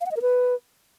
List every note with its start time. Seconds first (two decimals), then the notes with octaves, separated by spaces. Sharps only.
0.01 F5
0.06 F#5
0.11 D#5
0.17 A#4
0.22 B4